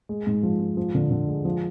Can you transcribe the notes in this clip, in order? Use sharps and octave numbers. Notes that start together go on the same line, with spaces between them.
G#3
G#2
F3
G#2
F3
D3
D3
G#3
F3